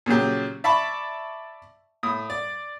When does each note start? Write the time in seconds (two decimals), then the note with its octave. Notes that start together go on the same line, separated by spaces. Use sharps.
0.06 A#2 C#3 F#3 G4
0.64 D5 E5 A5 B5 C#6
2.03 A2 D#6
2.30 D5